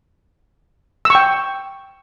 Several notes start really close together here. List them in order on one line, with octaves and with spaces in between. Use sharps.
E6 C#6 G5